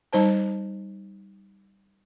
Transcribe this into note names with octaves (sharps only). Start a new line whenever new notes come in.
G3 D#4 C5 A5